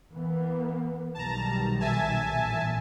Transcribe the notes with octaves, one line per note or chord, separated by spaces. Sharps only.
E3 A#3 B3
B1 D#3 G3 A5 A#5
E5 G#5 A5
A1 A#2